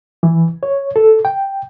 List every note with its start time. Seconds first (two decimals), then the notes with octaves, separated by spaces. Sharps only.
0.23 E3
0.63 C#5
0.96 A4
1.25 G5